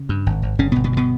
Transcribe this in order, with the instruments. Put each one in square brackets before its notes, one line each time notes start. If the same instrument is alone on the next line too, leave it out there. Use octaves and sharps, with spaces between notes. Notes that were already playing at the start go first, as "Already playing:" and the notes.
Already playing: [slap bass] C#3
G2
G#1
G#1
G1 C#3 C#4
B2 B3
G1
B2 B3
G2
B2 B3